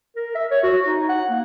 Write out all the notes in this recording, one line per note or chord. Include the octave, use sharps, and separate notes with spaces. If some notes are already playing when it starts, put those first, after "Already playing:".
A#4
E5
C#5
F#4
D#4
F#5
A#3